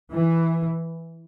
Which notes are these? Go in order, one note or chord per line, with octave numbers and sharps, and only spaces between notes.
E3